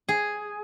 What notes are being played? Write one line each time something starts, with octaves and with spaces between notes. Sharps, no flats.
G#4